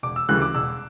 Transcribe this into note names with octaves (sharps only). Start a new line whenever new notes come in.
E1 D6
E6
D2 C#3 E3 G3 F#6
D6
E1 E6